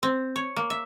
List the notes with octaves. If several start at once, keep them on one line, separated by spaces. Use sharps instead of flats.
C4
C#5
A#3
E5